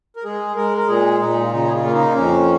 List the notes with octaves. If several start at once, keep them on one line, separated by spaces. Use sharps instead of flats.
A#4
G#3 G#4
G#3 A#4
A#4
A#2 G#4
A#2 D#4
F4
C#3 D#4
G#4
F4
A#3
D#4
F2 C#4